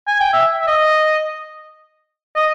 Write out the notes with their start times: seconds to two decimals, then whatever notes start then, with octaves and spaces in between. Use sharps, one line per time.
0.07 G#5
0.20 G5
0.33 E5
0.61 E5
0.67 D#5
2.36 D#5